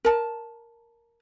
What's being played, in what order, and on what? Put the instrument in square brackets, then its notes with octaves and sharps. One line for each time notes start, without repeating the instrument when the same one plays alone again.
[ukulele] A#4 A5